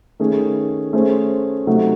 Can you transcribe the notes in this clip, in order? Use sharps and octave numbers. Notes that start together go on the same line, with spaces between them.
D#3 A3 C#4 G#4
A3 C#4 G#4 C5
C3 F#3 A3 D#4 F#4